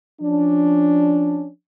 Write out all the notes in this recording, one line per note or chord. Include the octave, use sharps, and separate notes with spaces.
F3 C#4 D4